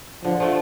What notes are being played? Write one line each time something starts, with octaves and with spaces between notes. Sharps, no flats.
D3 F3
F3 A3